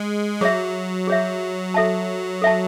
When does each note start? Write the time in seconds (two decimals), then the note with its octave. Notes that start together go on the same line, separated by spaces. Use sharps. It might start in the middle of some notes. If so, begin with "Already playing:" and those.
Already playing: G#3
0.41 F#3 G#4 C#5 E5
1.07 G#4 C#5 E5
1.74 A4 E5 A5
2.42 A4 E5 A5